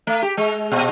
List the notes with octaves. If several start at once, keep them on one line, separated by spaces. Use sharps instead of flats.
A3
G4
G#3
A#2